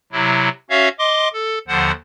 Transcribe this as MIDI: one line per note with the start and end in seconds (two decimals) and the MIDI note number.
0.12 0.49 48
0.12 0.49 54
0.12 0.49 64
0.70 0.89 61
0.70 0.89 66
0.70 0.89 73
0.70 0.89 76
0.70 0.89 77
0.99 1.29 75
0.99 1.29 84
0.99 1.29 86
1.33 1.59 69
1.68 1.91 39
1.68 1.91 50
1.68 1.91 53
1.68 1.91 72
1.68 1.91 78